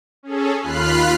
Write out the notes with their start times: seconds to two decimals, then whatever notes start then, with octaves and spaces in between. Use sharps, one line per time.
0.23 C#4 G#4 A4
0.61 D#2 F4 B5 F6 F#6 C7